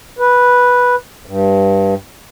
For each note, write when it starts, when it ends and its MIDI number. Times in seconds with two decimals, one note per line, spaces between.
0.19 0.95 71
1.26 1.94 43